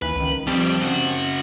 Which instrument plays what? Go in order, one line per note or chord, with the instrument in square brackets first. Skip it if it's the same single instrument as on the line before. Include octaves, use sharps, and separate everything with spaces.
[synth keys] D#2 E3 [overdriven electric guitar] B4
[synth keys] C#2 D#3
[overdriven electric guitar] F2 G3 [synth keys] C4 G5 A5
[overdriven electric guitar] C#3 F#4